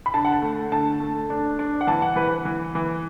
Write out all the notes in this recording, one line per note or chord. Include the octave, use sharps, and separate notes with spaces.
B5
D3 A5
F#5
A5
A3
D3 A5
A3
D4
D4
F#5
E3 A5
F#5
E3 B4
E3
E3